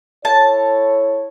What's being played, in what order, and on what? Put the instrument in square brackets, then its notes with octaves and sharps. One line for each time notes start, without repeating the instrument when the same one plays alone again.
[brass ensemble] E4 A4 C#5 [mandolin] A5